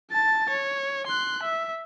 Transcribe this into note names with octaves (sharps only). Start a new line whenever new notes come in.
A5 A6
C#5
C6 F#6
E5